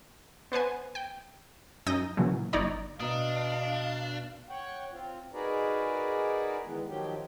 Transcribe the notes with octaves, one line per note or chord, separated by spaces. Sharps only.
B3 B4 C5 G#5
G5
F#2 D#4 D#6 G6 A#6
A#2 C#3 E3 F#3
G1 D#4 C#5 D5 A#5
B2 D4 D#5 F5 A#5 D#6
C#5 F#5 G5
C4 F4
D#4 F#4 G#4 A#4 B4 D5
D#3 E3 G#3 B3
D#3 F3 F#3 G4